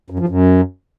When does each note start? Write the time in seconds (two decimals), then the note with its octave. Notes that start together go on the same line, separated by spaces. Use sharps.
0.10 F#2
0.19 F3
0.29 F#2